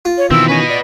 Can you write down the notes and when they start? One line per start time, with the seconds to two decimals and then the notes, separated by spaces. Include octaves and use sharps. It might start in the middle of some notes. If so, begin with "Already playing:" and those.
0.05 F4
0.18 C#5
0.31 B2 D#3 E3 C4 E4 E6
0.48 C#4 B4 D#5
0.68 D5